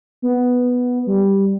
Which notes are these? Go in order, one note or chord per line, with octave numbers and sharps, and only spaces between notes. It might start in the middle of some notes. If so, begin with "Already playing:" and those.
B3
G3